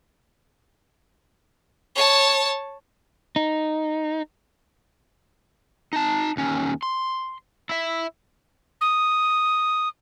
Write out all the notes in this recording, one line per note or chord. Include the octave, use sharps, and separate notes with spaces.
C#5 A5
D#4
D#4 A5
D#2 C#4
C6
E4 E5
D#6